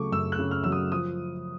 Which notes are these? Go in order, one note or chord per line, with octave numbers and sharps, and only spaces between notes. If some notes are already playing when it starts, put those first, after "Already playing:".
Already playing: C#3 F#3 A3 C#6 D6
F#2 E6
F#6
C#3
F6
F#3 E6
D#6
F3 D#6